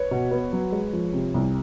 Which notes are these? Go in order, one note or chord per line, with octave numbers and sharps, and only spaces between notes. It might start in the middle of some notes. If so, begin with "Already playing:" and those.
Already playing: B4 C#5
B2
B3
F#3
G#3
F3
C3
C2